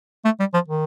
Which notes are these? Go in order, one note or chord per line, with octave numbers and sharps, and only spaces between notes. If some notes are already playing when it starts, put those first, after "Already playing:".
A3
G3
F3
D#3